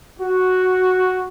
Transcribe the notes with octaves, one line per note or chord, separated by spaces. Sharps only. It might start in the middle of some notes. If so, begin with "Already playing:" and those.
F#4